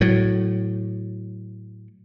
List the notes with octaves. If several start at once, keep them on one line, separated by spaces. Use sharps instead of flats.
A2 F#3